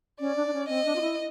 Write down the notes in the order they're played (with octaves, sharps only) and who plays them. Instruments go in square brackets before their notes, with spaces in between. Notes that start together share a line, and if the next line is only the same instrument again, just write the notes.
[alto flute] C#4 [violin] D5
[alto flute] D4
D4
C#4
[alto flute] C4 [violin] D#5
[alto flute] D4
F4
E4